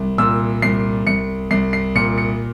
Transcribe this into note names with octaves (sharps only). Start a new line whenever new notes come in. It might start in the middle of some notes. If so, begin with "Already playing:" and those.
Already playing: C2
A#2 E6
C2 C7
C2 C#7
C2 C7
C7
A#2 C#7
C#7